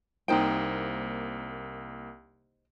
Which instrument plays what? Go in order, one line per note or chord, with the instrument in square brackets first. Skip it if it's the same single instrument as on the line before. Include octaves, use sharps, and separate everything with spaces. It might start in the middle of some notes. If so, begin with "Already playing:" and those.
[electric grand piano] C2 A#3 D7 [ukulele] D#4 C5 G5